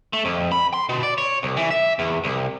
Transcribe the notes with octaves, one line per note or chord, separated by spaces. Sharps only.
A3
F2
B5
C6
B2
D5
C#5
C2
E3
E5
E2
C2